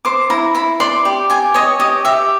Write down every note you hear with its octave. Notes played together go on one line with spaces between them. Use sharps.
C5 D6
E4 A#5
E4 B5
D5 C6
G4
G4 G#5
C#5 D#5
G4 D#5
G4 E5